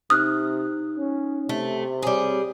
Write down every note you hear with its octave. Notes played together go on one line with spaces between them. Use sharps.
C3 D#4 D#6 F6 F#6
C#4
C3 A3
G3 C4 G#4 C#5 D6